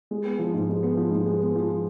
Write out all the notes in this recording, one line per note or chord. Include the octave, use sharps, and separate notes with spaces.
G#3
B3
F3
G#2
G#3
B3
F3
G#2
G#3
B3
F3